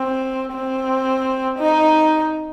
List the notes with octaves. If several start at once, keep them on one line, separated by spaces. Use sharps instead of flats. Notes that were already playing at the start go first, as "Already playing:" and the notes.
Already playing: C4
C4
D#4